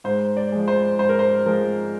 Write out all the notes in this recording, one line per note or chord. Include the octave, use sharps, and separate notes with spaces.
G#2 C5
D5
F3 G#3
C5
G#2 C5
A#4
C5
F3 G#3 A#4